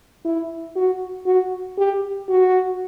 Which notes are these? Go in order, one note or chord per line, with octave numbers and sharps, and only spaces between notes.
E4
F#4
F#4
G4
F#4